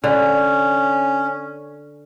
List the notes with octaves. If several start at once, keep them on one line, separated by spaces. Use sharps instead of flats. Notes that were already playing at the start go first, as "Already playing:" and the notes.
D3 C#4